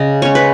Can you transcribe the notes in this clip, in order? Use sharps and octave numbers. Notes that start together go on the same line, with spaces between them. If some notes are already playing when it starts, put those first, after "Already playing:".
Already playing: C#3 D#5
G#3 C#4 C#5
B4